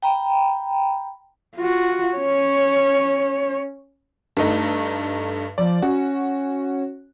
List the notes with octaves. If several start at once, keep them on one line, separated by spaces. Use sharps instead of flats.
G5 A#5 B5
F4 F#4
C#4 C#5
G2 A3 D#4
F3 D5
C#4 F#4